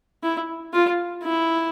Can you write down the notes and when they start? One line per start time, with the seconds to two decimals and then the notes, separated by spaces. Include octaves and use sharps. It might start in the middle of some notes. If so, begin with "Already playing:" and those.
0.23 E4
0.73 F4
1.24 E4